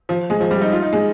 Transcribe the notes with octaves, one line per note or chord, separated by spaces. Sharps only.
F3
G#3
F3
G3
D#4
F4
D#4
G#3